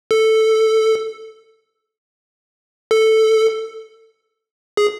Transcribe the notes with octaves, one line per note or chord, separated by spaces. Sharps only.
A4
A4
G#4